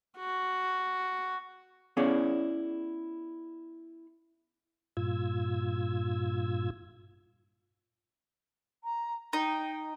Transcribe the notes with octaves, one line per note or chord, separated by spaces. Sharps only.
F#4
B3 C#4 E4 G#4 C#5 D5
G2 A#2 F4 E6 G#6
A#5
D#4 G5